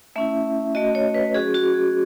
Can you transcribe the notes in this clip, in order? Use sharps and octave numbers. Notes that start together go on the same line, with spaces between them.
A3 C#4 E4 E5
A3 C#4 F#4 D#5
C#5
B4
F#3 C#4 F#4 G#4
F#4
G#4